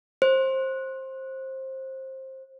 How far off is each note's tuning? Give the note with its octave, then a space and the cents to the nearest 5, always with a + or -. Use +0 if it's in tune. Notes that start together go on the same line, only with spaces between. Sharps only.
C5 +20